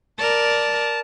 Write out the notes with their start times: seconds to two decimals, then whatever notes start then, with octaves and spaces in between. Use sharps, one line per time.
0.19 A#4 D5 A5